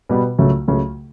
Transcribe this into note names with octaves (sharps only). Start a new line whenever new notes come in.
B2 G3 B3
C#2 C#3 F#3 A3
C#2 C#3 F#3 A3